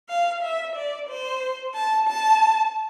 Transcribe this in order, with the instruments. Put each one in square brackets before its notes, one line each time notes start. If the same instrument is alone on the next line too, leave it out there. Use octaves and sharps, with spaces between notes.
[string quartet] F5
E5
D5
C5
A5
A5